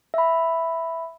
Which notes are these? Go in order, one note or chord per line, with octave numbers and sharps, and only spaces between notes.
E5 B5